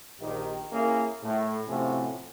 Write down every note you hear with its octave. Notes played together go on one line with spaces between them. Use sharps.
A#1 D#3 G4
A#3 C#4 E4 G#4 A#4
A2
A2 C3 F3 C4 C#4 F#4